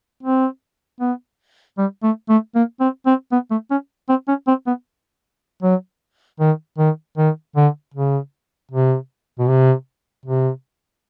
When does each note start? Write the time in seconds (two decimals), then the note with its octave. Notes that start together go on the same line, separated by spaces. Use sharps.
0.23 C4
1.00 B3
1.78 G3
2.03 A3
2.29 A3
2.55 A#3
2.80 C4
3.06 C4
3.32 B3
3.50 A3
3.71 C#4
4.09 C4
4.28 C#4
4.47 C4
4.66 B3
5.63 F#3
6.40 D#3
6.78 D#3
7.18 D#3
7.56 D3
7.94 C#3
8.71 C3
9.39 B2
9.49 C3
10.26 C3